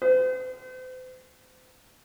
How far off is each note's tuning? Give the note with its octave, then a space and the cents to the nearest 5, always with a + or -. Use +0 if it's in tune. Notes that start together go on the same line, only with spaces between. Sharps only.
C5 -40